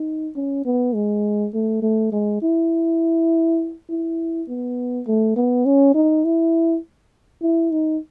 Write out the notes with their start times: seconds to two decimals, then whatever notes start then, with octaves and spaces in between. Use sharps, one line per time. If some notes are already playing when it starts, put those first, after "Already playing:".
Already playing: D#4
0.36 C#4
0.65 B3
0.95 G#3
1.54 A3
1.82 A3
2.12 G#3
2.42 E4
3.89 E4
4.48 B3
5.07 A3
5.36 B3
5.65 C#4
5.94 D#4
6.24 E4
7.42 E4
7.71 D#4